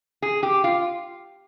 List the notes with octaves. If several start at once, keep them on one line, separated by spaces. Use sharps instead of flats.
G#4
G4
F4